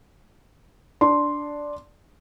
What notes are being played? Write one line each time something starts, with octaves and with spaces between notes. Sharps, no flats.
D4 C6